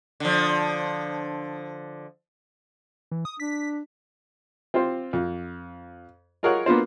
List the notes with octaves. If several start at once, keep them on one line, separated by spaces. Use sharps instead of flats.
D3 F3
E3
D#6
D4 B6
C4 F4 G4 C5
F2
F4 G#4 A#4 C#5 D#5 F#5
A#3 B3 D4 F4 C5